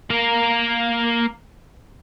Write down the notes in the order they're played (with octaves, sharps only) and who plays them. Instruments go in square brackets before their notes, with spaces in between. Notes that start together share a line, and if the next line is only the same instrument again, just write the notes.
[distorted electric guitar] A#3 A#4